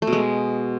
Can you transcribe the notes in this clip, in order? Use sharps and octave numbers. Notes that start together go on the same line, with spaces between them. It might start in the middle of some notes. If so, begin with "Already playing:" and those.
A3
B2
G#3